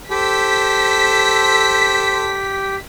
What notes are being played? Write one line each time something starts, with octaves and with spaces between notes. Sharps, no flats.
G4 A4 C5 B6